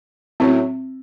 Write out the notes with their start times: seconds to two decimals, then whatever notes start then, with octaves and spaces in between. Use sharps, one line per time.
0.40 A2 F#3 C4 C#4 E4